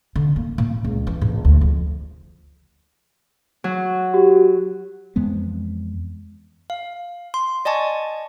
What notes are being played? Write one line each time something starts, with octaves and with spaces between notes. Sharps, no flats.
D3
A#3
A#2
C#2
E3
A#1
D2
F2
F#3
F#4 G4
F2 E3 G#3 B3
F5
C6
D5 D#5 G#5 A5 C#6